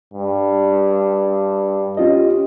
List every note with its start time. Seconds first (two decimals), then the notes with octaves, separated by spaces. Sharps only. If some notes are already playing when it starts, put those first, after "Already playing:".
0.14 G2
1.97 C#4 F4 G4 D#5